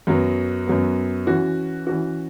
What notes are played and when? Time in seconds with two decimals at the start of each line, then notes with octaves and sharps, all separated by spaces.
0.07 F#2 F#3 B3
0.67 F#2 F#3 B3
1.27 E3 C#4 F#4
1.87 E3 C#4 F#4